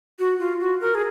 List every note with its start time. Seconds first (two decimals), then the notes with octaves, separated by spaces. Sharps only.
0.19 F#4
0.39 F4
0.60 F#4
0.81 A#4
0.95 G#4